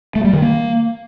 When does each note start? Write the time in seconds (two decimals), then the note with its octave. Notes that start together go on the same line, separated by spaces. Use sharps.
0.15 A3
0.24 G3
0.33 D#3
0.42 A#3